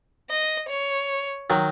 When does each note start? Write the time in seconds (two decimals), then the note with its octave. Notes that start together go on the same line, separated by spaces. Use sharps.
0.30 D#5
0.69 C#5
1.50 D#3 F#3